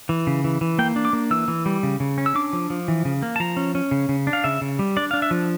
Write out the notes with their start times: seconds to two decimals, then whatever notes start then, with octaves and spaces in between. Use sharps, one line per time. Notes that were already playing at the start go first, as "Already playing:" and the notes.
0.09 E3
0.27 C#3
0.44 E3
0.61 E3
0.79 A#3 G5
0.96 D4
1.05 D6
1.13 A#3
1.31 E3 E6
1.48 E3
1.66 G3
1.83 C#3
2.00 C#3
2.18 C#4
2.26 E6
2.35 D4 D6
2.53 F3
2.70 F3
2.88 E3
3.05 C#3
3.23 A#3
3.36 A5
3.40 F3 A#5
3.57 C#4
3.75 C#4
3.91 C#3
4.09 C#3
4.27 D4
4.33 F5
4.44 C#3 E5
4.61 C#3
4.79 G3
4.97 D4 D5
5.11 D4 F5
5.22 E5
5.31 F3